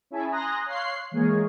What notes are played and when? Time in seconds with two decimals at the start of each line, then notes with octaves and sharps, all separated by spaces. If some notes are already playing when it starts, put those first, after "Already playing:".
0.11 C#4 E4 G#4 E5 G#5 A5
0.31 G#5 A#5 C6 D#6 F#6 A#6
0.66 C#5 F5 C6 F#6 C7
1.11 E3 G#3 A#3 G#4 A#4 C#5